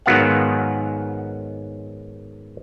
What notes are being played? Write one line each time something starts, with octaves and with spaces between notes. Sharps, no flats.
G#2 D#3 F#3 B3 F5 F#5